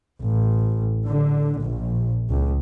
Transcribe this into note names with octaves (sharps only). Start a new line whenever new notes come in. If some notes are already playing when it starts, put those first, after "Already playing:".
A1
D3
A#1
C#2